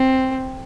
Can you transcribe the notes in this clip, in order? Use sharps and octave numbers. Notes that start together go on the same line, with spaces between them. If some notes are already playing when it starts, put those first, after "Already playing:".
Already playing: C4